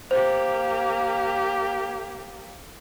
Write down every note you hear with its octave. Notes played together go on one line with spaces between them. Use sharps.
A#3 G4 C5